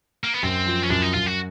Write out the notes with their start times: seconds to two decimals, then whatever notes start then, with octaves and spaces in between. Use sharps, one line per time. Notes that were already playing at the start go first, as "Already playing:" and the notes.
0.24 A#3
0.34 B3
0.43 F#2 C4
0.66 F3
0.83 C#4
0.90 F#2 D4
1.02 D#4
1.14 F#2 F4
1.27 F#4